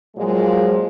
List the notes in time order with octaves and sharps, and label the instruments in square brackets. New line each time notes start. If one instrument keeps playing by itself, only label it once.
[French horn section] A#2 F3 F#3 G#3